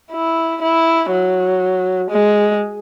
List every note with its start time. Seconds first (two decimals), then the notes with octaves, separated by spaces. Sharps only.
0.13 E4
0.62 E4
1.11 F#3
2.10 G#3